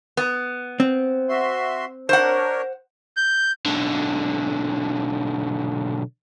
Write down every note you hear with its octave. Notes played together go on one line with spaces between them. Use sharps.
B3
C4
F#4 E5 C6
D4 A#4 C5 C#5 F#5
G6
B1 D3